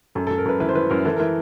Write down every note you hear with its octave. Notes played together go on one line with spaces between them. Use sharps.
F#2 A4
A4
F#2
A#4
F#2 B4
E3 B4
C5
E3 B4
F#2 A#4
E3 A4
E3 A#4